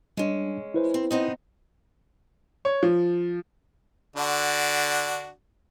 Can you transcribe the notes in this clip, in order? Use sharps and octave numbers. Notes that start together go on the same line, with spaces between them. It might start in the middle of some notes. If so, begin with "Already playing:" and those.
G3 G#3 C#4 D4
E4 B4 C5
C4
B3 C4 D#4
C#5
F3
D3 D4 F#4